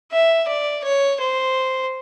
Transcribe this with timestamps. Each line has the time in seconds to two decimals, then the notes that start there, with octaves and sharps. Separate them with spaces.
0.12 E5
0.48 D5
0.84 C#5
1.20 C5